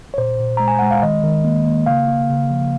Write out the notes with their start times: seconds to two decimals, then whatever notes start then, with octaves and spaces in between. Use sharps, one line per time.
0.14 C#5
0.18 A#2 C5
0.40 A#2
0.57 G#3 A#5
0.68 G#5
0.79 G#3 F#5
0.91 F5
1.03 D#3 D#5
1.23 D#3
1.45 A#3
1.65 A#3
1.86 C#3 F5
2.08 A#3
2.29 C#3
2.51 F3